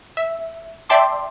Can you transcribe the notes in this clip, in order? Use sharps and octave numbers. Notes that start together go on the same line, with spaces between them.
E5
D5 E5 G5 A5 C6 D6